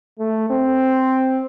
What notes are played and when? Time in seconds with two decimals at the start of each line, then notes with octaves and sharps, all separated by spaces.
0.20 A3
0.50 C4